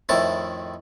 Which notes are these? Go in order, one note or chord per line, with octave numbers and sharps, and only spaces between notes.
F2 A2 D#3 E4 A5